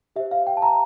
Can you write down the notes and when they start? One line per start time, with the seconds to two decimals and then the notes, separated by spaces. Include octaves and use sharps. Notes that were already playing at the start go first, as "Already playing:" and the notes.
0.16 G4 E5
0.20 C5
0.31 F5
0.47 G5
0.57 A5
0.62 A#5